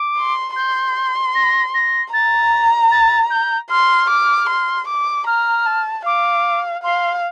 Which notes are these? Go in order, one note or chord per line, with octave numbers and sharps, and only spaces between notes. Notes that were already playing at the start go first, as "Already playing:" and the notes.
Already playing: D6
C6
C6 G6
A#6
A#6
A#5 A6
A6
G6
C6 F6
D6
C6
D6
A#5 F6
A5
F5 D6
F5 C6